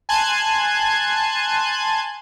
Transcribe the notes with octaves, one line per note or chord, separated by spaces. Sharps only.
G#5 A5 C6 F#6 G#6